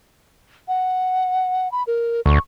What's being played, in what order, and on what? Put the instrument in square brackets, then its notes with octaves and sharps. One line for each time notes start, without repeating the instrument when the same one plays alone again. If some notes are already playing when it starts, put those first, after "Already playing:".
[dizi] F#5
B5
A#4
[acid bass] D2 [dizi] C#6